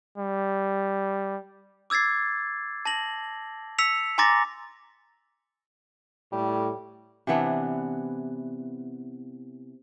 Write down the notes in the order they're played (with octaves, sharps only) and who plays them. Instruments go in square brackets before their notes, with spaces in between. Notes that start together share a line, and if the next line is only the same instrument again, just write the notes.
[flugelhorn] G3
[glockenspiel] D6 E6 G#6 A6 C7
A5 A#6 F#7
E6 B6 C#7 F7
G#5 A#5 C6 D6 A6 A#6
[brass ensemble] A2 [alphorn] G3
[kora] C3 E3 B3 D4